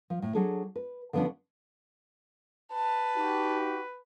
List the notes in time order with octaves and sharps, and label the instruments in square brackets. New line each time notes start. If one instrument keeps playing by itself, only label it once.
[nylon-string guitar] F3
A2
F#3 D4 G#4 A4
B4
D3 F3 B3 C#4 D4
[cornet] B4 [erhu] A5
[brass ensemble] D#4 F#4 G4